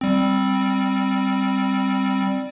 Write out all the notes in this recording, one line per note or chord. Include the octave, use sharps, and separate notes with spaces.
G3 C4